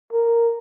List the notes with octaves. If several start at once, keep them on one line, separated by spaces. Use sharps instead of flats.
A#4